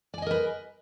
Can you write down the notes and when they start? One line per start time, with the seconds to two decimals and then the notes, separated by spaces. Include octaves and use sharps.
0.14 D5
0.18 G#5
0.22 D#5
0.26 A#4
0.31 B4